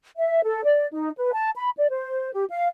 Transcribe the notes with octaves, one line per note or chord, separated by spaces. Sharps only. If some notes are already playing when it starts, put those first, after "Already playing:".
E5
A4
D5
D#4
B4
A5
B5
D5
C5
G4
F5